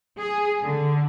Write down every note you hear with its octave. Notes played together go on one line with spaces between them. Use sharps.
G#4
D3